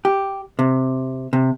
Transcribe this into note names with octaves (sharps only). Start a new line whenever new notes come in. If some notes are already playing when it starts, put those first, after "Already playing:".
G4
C3
C3